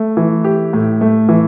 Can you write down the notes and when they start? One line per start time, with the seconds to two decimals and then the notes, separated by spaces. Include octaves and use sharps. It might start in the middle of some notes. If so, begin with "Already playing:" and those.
Already playing: A3
0.17 E3
0.44 G4
0.73 A2
1.01 A3
1.29 E3